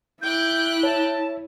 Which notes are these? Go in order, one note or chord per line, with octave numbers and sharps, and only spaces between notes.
E4 G5 D6 F#6 G6
C#5 A5